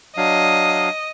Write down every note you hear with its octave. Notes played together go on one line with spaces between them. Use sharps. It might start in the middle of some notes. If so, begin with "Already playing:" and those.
F#3 D4 D#5 F5